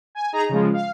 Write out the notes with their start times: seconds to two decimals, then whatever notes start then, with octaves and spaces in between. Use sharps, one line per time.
0.15 G#5
0.33 D#4 G#4 A#5
0.49 C#3 F3 G#3
0.73 F5